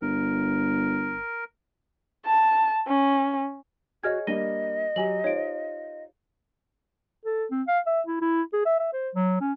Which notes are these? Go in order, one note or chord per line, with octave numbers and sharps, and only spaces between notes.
G1 A#4
A5
C#4
F#4 G#4 C#5 D#5 F6 G#6
G3 A#3 D4 D#5 A#6 D#7 G7
F#3 G4 G#5 F#7
D#4 F4 C5 C#5 D7
A4
C4
F5
E5
E4
E4
G#4
E5
E5
C5
F#3
C#4